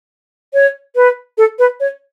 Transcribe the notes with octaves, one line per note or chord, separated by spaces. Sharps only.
C#5
B4
A4
B4
C#5